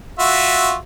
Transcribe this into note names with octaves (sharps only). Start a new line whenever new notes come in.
F4 F#4 E5